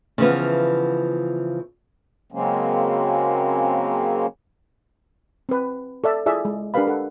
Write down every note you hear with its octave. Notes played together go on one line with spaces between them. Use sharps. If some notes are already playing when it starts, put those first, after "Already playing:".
C#3 E3 F3 B3
C#3 F#3 G#3 A#3 C4 C#4
C4 B4
A4 D5 E5
E4 F4 G#4 D5 E5
G#3
D4 G4 A#4 B4 F5 B5
A4 F#5